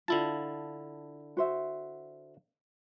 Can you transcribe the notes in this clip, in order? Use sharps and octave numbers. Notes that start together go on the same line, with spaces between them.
D3 E4 F4 A5
F#4 C5 E5